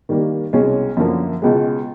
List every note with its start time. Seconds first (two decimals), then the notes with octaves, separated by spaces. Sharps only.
0.09 D#3 G3 A#3
0.53 C2 B2 G#3 C#4
0.97 F#2 D3 F3 A#3
1.42 C#2 B2 G#3